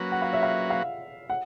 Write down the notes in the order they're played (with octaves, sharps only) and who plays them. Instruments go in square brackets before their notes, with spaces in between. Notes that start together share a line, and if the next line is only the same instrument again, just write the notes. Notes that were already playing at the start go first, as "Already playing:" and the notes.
Already playing: [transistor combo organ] F#3 A#3 C#4 F#4 B4
[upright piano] F#5
F5
E5
F5
F5
F#5